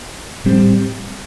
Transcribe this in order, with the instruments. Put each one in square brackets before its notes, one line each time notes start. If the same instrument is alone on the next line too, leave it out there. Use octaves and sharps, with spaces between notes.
[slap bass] A2 G3 C4